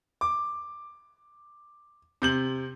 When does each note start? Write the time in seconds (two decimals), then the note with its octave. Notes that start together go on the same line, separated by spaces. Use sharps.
0.21 D6
2.22 C3 G6 F#7